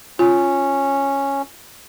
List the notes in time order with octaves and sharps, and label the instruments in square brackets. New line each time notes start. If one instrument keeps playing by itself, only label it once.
[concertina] C#4 [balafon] F4